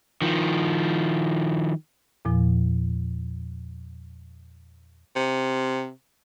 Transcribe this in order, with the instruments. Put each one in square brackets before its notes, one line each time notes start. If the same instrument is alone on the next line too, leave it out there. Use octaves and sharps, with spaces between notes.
[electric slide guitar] D#3 F3
[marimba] E2 A#2 F3
[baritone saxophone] C3